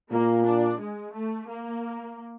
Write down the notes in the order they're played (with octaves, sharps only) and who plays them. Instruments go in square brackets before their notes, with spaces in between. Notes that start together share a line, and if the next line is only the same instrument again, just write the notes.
[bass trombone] A#2 [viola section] A#3
[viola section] D4
G#3
A3
A#3